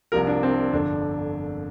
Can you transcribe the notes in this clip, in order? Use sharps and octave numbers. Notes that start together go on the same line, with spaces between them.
C2 C3 F3 A#4
D4
C4
G1 F2 D3 D4